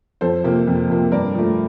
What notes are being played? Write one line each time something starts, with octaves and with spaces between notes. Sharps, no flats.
F2 A4 C5
C3 F3 A#3
F2
C3 F3 A#3
G2 A#4 D5
F3 A3